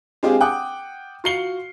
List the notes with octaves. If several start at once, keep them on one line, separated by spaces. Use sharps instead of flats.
G#3 C4 D4 F4 G4 G#4
F#5 G5 D6 D#6 F#6
F4 F#4 C7 C#7 G7